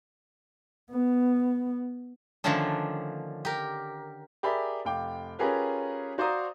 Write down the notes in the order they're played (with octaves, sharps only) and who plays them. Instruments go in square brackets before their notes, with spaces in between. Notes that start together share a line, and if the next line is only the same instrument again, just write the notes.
[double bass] B3
[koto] D3 D#3 F3 A3 C#4 D4
G4 A#4
[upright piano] G4 G#4 A#4 D5 E5 B5
F1 F5 G5 D6
C#4 F4 G4 G#4 A#4 B4
F#4 C5 D5 F5 A#5 D#6